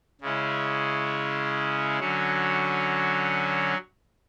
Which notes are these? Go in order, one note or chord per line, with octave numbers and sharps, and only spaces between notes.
C#3 G#3 C#4 E4
D3 F#3 C#4 F#4